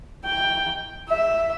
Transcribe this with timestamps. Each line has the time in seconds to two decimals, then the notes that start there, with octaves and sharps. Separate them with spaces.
0.25 G5
1.09 E5